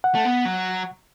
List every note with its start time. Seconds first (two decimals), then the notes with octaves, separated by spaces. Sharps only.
0.04 F#5
0.15 A3
0.25 B3
0.45 F#3